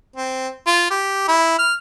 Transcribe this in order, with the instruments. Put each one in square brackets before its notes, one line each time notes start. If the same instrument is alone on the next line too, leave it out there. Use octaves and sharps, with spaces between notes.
[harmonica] C4
F4
G4
E4
F6